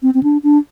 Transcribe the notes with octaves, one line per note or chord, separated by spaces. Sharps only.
C4
C4
D4
D4